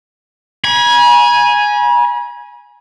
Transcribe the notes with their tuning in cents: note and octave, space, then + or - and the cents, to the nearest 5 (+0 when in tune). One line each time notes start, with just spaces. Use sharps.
G#5 +0 B5 -45